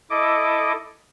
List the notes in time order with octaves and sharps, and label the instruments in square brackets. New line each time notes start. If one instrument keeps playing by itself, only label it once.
[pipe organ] E4 A4 D#5 D6